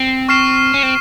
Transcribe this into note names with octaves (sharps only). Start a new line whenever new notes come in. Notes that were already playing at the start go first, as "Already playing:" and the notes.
Already playing: C4
C#6 F6 C7 E7
C#4
C4